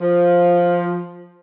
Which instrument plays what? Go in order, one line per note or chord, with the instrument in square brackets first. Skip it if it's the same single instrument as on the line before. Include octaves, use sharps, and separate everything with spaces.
[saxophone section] F3